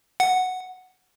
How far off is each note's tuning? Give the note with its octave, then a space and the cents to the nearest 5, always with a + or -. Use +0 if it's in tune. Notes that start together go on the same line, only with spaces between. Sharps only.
F#5 +0